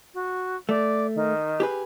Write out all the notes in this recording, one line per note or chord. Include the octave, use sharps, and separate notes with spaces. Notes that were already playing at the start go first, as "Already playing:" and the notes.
F#4
A3 D5
D#3
G4 G#4 B4